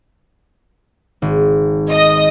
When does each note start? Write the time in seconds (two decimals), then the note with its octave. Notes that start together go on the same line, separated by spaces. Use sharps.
1.22 G#1
1.90 D#5 D#6